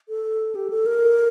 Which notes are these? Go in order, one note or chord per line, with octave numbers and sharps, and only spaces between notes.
A4
G4
A4
A#4